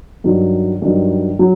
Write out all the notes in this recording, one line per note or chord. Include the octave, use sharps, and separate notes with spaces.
G2 D#3 F#3
G2 D#3 F#3
F#3